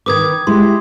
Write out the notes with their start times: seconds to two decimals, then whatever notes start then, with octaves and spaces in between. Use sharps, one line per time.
0.06 D#3 A#4 B4 D6 D#6 G#6
0.47 G#3 E4 G4 C6